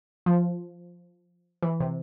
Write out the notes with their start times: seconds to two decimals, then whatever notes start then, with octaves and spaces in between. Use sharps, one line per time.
0.26 F3
1.63 E3
1.80 C3